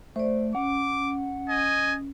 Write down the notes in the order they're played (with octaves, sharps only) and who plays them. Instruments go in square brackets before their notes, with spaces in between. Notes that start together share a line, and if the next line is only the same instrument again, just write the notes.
[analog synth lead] A3 [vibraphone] C5 D5
[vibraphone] C#4 [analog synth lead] F#5 [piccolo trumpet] D6
[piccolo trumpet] D#5 [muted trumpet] G#5